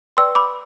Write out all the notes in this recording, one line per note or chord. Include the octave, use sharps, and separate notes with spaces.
B4 D5 G5 C6 E6
B5 D6